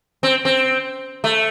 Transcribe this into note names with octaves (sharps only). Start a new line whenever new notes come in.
C4
C4
A3